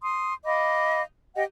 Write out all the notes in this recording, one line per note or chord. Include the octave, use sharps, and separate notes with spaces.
C6 D#6
D#5 F5 B5 D6
G4 D#5 F#5 G5